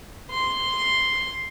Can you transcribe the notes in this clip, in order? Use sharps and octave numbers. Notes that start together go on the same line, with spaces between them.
C6